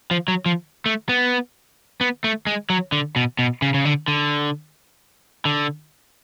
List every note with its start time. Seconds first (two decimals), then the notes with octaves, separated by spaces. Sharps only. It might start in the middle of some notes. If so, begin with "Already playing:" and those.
0.11 F3
0.28 F#3
0.46 F3
0.86 A3
1.09 B3
2.01 B3
2.24 A3
2.47 G#3
2.70 F#3
2.92 D3
3.16 B2
3.39 B2
3.62 C#3
3.74 C#3
3.85 D3
4.08 D3
5.45 D3